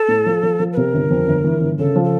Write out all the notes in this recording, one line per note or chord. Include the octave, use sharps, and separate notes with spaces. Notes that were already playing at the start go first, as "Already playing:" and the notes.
Already playing: A4
A2
F3
F3
F3
B4
C3 A#4
G1
F2
G1
E3
G1
C#3 A4
F3
A4